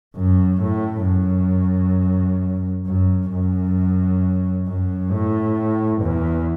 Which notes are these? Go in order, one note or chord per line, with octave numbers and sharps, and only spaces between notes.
F#2
A2
F#2
F#2
F#2
F#2
A2
E2